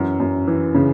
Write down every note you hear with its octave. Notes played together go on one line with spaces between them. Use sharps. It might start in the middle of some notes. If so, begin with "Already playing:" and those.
Already playing: F#2 E3
F#2
E3
C#3